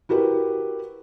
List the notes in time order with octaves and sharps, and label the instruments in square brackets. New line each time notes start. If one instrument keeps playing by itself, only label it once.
[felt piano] E4 F#4 G4 A#4 B4